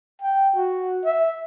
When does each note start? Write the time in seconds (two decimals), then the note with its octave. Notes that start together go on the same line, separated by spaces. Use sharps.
0.22 G5
0.56 F#4
1.04 E5